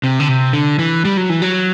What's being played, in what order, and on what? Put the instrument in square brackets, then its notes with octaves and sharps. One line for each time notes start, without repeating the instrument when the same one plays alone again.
[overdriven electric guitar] C3
D3
C3
D3
E3
G3
F#3
E3
F#3